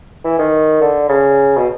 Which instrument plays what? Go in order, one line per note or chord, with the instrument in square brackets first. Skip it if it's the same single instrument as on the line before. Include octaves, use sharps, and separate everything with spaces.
[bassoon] E3
D#3
D3
C#3
B2